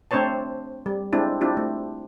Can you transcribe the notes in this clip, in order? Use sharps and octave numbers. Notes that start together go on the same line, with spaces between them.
A3 C4 D4 C5 C#5 A5
G3
G#3 C4 D4 E4
C4 D4 E4 F4 G4
A3